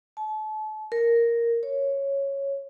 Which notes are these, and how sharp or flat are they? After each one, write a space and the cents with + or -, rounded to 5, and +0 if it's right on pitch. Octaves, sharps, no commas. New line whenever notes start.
A5 -35
A#4 +0
C#5 -5